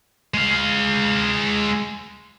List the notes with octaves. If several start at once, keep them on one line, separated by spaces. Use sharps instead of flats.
G#3 F5